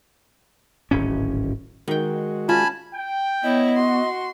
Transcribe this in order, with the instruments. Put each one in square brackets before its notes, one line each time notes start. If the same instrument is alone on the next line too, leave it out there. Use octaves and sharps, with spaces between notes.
[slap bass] D1 G#1 C#4
[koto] D#3 G5 [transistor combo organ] G#3 F#4
[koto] C#4 [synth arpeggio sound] F4 [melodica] G#5 A5 B5
[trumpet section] G5
[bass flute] B3 [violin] E4 C#5 [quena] D#5
[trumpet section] F#4 [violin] C6